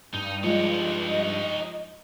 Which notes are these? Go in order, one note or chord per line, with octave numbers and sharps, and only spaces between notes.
G2 D#4
F3 G#3 D#4 C#5 D#5